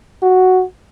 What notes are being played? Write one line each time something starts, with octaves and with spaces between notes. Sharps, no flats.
F#4